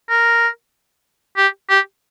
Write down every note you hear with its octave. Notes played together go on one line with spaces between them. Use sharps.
A#4
G4
G4